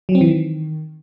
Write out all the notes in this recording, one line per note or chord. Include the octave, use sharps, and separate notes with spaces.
F#3
C4
E3
D#3